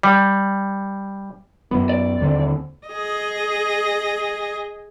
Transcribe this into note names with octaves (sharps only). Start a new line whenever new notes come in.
G3
F#2 B3
D5
D#2 D3 C4
G#4 D#5